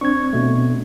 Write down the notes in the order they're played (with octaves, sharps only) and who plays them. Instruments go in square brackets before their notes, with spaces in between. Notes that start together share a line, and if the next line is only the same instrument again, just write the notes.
[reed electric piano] C4 D4 [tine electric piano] C#6 G#6
[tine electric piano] B2 A3